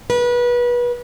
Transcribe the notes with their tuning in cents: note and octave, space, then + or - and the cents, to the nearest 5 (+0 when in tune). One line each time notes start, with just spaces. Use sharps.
B4 -30